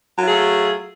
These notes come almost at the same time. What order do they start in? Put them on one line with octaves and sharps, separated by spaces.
F#3 F4 G#4 A3